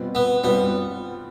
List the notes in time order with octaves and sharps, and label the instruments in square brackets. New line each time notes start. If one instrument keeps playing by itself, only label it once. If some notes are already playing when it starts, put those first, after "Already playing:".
Already playing: [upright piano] B2 G3 C4 F4 B4
[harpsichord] B3
[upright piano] B2 G3 C4 F4 B4 [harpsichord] B3